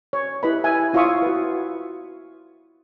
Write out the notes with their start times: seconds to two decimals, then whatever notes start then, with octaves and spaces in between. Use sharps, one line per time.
0.13 C#5
0.43 E4 G4 B4 D#5 B5
0.64 D#5 E5 G#5
0.93 E4 F4 C#5 E5 C#6 D#6
1.22 F#4 B4